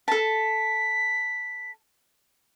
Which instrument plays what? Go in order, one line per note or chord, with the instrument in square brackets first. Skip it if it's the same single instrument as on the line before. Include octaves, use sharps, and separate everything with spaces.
[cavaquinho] A4 A5 [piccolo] B6